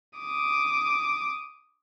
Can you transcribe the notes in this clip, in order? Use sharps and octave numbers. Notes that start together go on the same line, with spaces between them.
D6 D#6